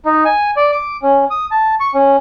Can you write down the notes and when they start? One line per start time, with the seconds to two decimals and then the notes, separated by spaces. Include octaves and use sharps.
0.06 D#4
0.25 G#5
0.57 D5
0.72 D6
1.03 C#4
1.31 D#6
1.51 A5
1.80 C#6
1.94 C#4